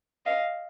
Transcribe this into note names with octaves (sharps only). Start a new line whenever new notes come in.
D#5 F5